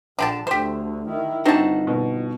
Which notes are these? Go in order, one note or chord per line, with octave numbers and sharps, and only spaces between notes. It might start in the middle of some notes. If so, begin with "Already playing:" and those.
A#1 D3 G5 A5
D2 D3 G4 C5
D#3 E4
G1 C4 D4 D#4 F#4 A5
B2